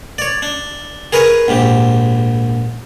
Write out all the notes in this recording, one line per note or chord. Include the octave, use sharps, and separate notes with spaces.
C#5 D5
D4
G#4 A#4 B4 C#5 G#5
A#1 G#2 G4